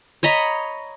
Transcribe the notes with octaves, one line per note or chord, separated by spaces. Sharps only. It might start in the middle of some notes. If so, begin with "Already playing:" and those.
C#5 D#5 A#5 B5